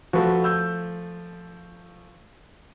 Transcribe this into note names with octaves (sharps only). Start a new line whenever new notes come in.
F3 A3 F#4 B4
E6 G6